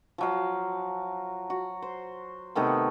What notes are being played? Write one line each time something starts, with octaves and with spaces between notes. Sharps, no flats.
F3 F#3 F5
F#4
C5
C3 D#3 A3 B3